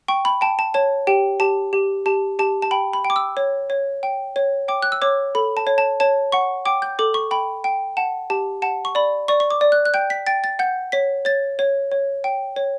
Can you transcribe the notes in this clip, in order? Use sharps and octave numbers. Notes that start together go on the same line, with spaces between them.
G5 C#6
B5
G5 A5
A5
C#5 A5
G4 G5
G4 A5
G4
G4 A5
G4 A5
A5
G5 B5
B5
G5
D6
E6
C#5
C#5
G5
C#5
G5 D6
F#6
E6
C#5 D6
A4 B5
A5
C#5
A5
C#5 A5
F#5 C#6
G5 D6
G6
A4 D6
C#6
G5 B5
G5
F#5 A5
G4 A5
F#5 A5
C#6
D5 B5
D5 C#6
C#6
D6
D5
F#6
F#6
G5 G6
B6
G5 A6
A6
F#5 G6
C#5 B6
C#5 A6
C#5
C#5
G5
C#5